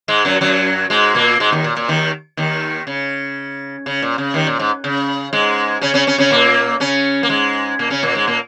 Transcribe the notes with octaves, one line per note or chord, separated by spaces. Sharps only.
G#2 G#3
F#2 F#3
F#2 F#3
G#2 G#3
A#2 A#3
G#2 G#3
D#2 D#3
A#2
A#2
D#2 D#3
D#2 D#3
C#3
C#3
A#2
C#3
D#2 D#3
A#2
G#2
C#3
G#2 G#3
C#3 C#4
C#3 C#4
C#3 C#4
C#3 C#4
A#2 A#3
C#3 C#4
A#3
G#2 G#3
A#2 A#3
C#3 C#4
A#2 A#3
G#2 G#3
A#2 A#3